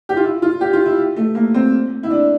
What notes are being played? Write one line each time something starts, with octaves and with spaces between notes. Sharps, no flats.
G4
F4
E4
F4
G4
F4
E4
A3
A#3
C4
E4
D4